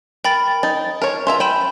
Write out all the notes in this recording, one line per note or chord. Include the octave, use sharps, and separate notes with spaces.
A#4 G5 B5 A6
D#4 A6
A#4 C#5
F4 E5 A#5
G5 G#5 B5 E7